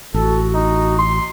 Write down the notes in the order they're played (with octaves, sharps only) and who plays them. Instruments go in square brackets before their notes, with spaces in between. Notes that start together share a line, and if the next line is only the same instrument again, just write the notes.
[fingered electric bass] A1 [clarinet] F#4 [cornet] A4
[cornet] D#4
[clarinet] C6